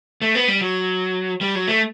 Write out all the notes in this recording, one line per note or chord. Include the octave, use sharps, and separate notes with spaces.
A3
B3
G3
F#3
G3
F#3
A3